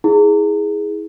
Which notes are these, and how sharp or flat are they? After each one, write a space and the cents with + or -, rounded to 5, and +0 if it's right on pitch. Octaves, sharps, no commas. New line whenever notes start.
E4 -30 G#4 +0